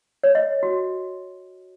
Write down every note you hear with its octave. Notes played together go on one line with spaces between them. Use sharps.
C#5
D#5
F#4